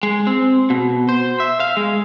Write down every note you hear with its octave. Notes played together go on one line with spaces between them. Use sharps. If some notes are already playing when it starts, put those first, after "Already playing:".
G#3
C4
B2
C5
E5
F5
G#3